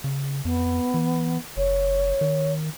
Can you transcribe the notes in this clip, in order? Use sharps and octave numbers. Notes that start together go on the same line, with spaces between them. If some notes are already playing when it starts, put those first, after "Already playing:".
C#3
F2 B3
E3
F#1 C#5
D#3